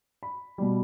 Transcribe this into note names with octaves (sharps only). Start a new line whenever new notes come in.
B5
B2 G3